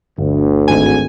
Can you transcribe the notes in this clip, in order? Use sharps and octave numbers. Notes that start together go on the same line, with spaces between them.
G1 D2
G#1 G#5